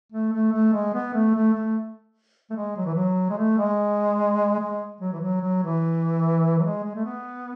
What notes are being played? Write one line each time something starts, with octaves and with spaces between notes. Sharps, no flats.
A3
A3
A3
G#3
B3
A3
A3
A3
A3
G#3
F#3
E3
F#3
G#3
A3
G#3
G#3
F#3
E3
F#3
F#3
E3
F#3
G#3
G#3
A3
B3